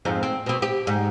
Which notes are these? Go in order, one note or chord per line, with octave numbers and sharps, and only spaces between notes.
F2 G#2 C4
C4
B2 C4
G4
G#2